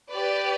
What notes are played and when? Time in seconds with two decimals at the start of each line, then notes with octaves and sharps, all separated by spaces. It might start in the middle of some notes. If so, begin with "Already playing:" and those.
0.12 G4 B4 D5